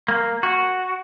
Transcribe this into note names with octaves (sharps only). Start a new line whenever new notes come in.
A#3
F#4